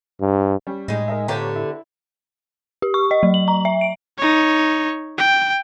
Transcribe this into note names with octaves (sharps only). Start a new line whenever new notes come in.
G2
G3 C#4
A2 G#3 D#4
A#4 D#5 E5
D3 B3 F4 G4 C#5 A#5
E4
G4
C#6
D#5
F#3
F#7
A#5
E5
D7
D#4 C#5
G5